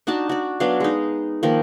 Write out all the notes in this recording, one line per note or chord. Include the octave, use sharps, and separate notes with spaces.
D4 D#4 F#4 A5
F#4 D5
F#3 B3 D4 F5
G#3 D#4
D#3 F3 A#3